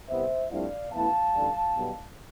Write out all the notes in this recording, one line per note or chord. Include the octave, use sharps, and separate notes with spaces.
C2 C3 G3 B3 C5 E5
G2 F3 A3 C4 E4 D5 F5
A1 A2 E3 B3 E4 F5 A5
A1 G2 D3 G3
B1 B2 G3 B3